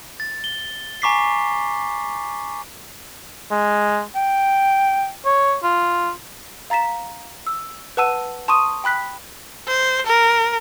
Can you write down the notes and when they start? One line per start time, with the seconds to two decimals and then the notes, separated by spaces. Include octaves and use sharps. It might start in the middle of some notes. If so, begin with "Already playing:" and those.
0.20 A6
0.44 G7
1.02 G#5 A#5 C#6 D6 B6 C7
3.51 G#3
4.15 G5
5.25 C#5
5.63 F4
6.70 F5 A#5 A6 B6 E7
7.47 E6
7.97 B4 F#5 A5 E6 D#7
8.48 A5 C6 C#6 D#6 D#7
8.84 G5 B5 F#6 B6
9.67 C5
10.06 A#4